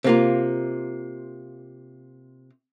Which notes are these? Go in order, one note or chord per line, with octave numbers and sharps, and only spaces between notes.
C3 A#3 F4